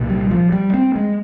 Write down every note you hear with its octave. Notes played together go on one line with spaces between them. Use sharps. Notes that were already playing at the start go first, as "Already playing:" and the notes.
Already playing: C2 A#2
G3
F3
G3
C4
G#3